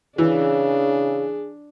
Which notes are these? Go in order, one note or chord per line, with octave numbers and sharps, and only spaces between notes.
C#3 E3 D4 G#4